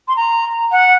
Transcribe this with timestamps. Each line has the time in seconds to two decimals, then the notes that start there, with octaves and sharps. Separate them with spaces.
0.08 C6
0.16 A#5
0.72 F#5